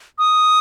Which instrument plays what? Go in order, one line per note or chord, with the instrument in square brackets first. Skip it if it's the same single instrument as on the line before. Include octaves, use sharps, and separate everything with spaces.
[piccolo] D#6